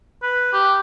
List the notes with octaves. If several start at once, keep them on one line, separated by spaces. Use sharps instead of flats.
B4
G4